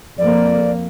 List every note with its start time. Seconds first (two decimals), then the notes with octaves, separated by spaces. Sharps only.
0.18 F2 A#3 D5